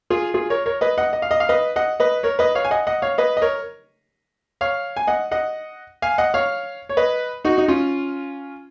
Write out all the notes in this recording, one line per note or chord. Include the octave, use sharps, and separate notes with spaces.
F4 G#4
F4 G#4
A#4 C#5
A#4 C#5
B4 D#5
D#5 F#5
D#5
F5
D#5
F5
B4 D#5
D#5 F#5
B4 D#5
A#4 C#5
B4 D#5
C#5 F5
G#5
D#5 F#5
D#5 F#5
C#5 F5
B4 D#5
D#5
A#4 C#5
C#5 F5
G#5
D#5 F#5
D#5 F#5
F5 G#5
D#5 F#5
C#5 F5
C#5
B4 D#5
D#4 F#4
D#4
C#4 F4